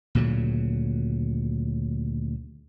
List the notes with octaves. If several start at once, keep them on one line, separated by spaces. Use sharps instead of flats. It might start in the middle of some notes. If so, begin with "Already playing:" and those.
D2 A#2 C#3 F#3